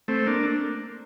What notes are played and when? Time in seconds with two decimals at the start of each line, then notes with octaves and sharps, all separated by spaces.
0.08 A3 C4
0.26 A#3 D4